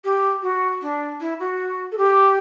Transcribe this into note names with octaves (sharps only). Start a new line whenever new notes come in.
G4
F#4
D4
E4
F#4
A4
G4